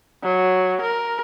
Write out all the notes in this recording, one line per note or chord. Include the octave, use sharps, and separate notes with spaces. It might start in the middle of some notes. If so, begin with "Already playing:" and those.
F#3
A#4